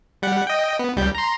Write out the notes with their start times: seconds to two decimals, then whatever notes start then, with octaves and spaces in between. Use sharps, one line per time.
0.22 G3 F#5
0.47 D#5 G5
0.79 B3
0.96 C#2 G3 G6
1.15 A#5 C6